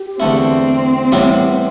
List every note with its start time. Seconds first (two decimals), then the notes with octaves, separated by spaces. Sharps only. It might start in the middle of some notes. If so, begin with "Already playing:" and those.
Already playing: G4
0.20 E2 D3 A3 C4 E4
1.12 A2 E3 G3 B3 E4